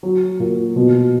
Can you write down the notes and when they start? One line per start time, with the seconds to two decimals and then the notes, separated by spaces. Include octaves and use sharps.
0.03 F#3
0.40 A#2
0.76 B2